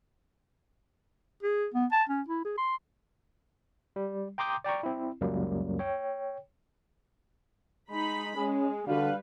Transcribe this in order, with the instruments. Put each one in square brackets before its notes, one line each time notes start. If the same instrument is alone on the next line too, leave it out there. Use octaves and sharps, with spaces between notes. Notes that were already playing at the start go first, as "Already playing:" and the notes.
[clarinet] G#4
B3
A5
C#4
E4
G#4
C6
[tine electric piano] G3
G5 A#5 C6 D6 D#6 G6
D5 G5 A#5 C#6
C4 E4
C#2 F#2 F#3 G3 A#3
C#5 G5
[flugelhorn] G#3 [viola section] D#4 B5
[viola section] G#3 [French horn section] C#4 [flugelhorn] G#4
[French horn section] D3 D4 F#4 [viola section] G3 B4 [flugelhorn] F5